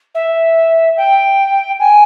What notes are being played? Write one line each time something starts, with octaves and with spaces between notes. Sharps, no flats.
E5
G5
G#5